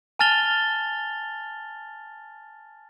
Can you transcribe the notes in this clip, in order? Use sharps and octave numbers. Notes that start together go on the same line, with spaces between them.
G#5 A5 F6 A6 F7 G7